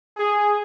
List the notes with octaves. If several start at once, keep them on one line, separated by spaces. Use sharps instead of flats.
G#4